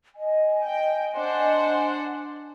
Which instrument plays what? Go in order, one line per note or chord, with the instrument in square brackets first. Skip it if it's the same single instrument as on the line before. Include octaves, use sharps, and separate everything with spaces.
[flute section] D#5 G#5
[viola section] G5
D4 C5 F#5